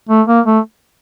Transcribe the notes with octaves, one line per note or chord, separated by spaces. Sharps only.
A3
A#3
A3